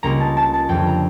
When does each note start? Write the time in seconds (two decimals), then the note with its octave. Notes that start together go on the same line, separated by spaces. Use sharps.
0.03 C#2 C#3 G3 A#3 A#5
0.20 A5
0.37 A5
0.54 A5
0.69 F2 D3 G3 G5
0.87 A#5